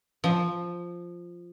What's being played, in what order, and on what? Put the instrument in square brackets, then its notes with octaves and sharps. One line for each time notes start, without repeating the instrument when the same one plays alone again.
[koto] F3